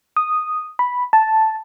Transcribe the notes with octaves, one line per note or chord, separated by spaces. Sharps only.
D#6
B5
A5